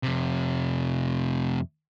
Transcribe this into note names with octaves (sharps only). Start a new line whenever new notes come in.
F2 C3